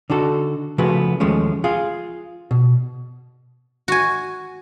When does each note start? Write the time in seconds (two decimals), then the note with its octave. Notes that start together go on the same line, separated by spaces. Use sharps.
0.10 D3 D#4 F#4 A4
0.78 C#3 F3 A3 B3 F#4 B4
1.20 D#2 F3 G#3 A3 C#4
1.64 F4 G#4 F5
2.51 B2
3.88 F#4 G#5